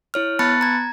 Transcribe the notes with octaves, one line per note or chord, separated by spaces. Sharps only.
E4 C#5 F6
B3 A5 B5 F#6 A6 C#7
A#5 G#6